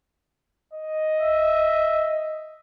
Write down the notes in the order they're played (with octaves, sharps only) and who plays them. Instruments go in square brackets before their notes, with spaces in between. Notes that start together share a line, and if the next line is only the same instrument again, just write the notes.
[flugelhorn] D#5
[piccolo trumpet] E5